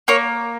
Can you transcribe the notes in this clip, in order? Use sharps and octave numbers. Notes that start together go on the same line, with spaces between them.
A#3 C#5